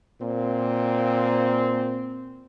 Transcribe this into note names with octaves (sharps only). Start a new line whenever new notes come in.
A#2 C4